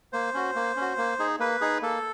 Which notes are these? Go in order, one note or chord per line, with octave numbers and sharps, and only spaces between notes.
A#3 C5
C#4 F#4
A#3
C#4
F#4
A#3
D#4 G#4
A#3 B4
D#4 G#4
A#3 A4